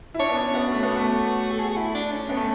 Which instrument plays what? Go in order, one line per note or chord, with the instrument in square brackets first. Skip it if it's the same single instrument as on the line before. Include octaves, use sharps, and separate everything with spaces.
[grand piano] E4
[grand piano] D4 [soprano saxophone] C#5
[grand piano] B3
C#4
[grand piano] B3 [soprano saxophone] F#4
[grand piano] A3
B3
A3
[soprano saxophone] A4
G#4
F#4
E4
D4
C#4
[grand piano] B3 [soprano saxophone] C#4
[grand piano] A3